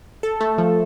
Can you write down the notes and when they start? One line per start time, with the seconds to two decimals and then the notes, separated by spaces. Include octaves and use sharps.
0.23 A4
0.41 A3
0.58 F3